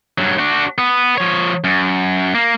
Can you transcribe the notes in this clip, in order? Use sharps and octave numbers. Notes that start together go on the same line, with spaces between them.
G2 F#3
D4 F#4
B3
F3 C#5
F#2
A#3